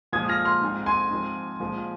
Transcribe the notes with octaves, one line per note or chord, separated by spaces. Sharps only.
A#2 F3 G#3 D#6 G#6
F6 A#6
C6 F6
G#2 G#3 C4
G#5 C6
G#2 F3 C4
A#2 F3 G#3